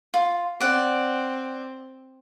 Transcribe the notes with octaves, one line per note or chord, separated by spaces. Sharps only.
F4
C4 D5 F#5